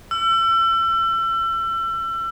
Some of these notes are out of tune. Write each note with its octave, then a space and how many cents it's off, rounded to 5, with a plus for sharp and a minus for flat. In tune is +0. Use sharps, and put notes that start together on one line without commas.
E6 +35